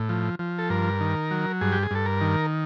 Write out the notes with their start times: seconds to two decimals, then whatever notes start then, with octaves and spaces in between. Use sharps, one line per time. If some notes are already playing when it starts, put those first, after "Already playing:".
Already playing: A2
0.09 F3
0.39 F3
0.59 A4
0.70 G2 A#4
1.01 D#3
1.31 F#3
1.61 G2 G#4
1.72 G4
1.83 G#4
1.91 G2 A4
2.06 A#4
2.21 D#3